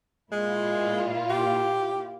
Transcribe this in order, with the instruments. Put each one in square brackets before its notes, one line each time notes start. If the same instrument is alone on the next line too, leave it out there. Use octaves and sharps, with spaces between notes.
[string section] A#2 E4 F4 [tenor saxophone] G#3
[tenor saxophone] G4